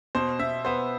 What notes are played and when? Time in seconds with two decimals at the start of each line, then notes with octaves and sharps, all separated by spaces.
0.15 B2 C5
0.39 B2 E5
0.65 B3 C5